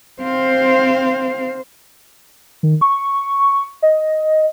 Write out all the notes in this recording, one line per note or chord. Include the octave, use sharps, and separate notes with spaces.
C4 C5 F5
D#3
C#6
D#5